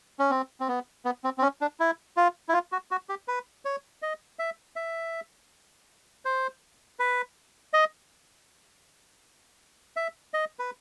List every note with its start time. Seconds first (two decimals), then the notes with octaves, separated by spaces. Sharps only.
0.19 C#4
0.31 C4
0.60 C4
0.68 B3
1.05 B3
1.24 C4
1.38 C4
1.42 C#4
1.61 D4
1.80 E4
2.17 F4
2.49 E4
2.53 F4
2.72 F#4
2.91 F#4
3.09 G4
3.28 B4
3.65 C#5
4.02 D#5
4.39 E5
4.76 E5
6.25 C5
6.99 B4
7.73 D#5
9.96 E5
10.34 D#5
10.59 B4